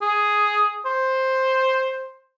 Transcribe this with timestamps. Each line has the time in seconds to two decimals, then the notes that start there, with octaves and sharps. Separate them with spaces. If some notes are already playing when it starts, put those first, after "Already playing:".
0.02 G#4
0.86 C5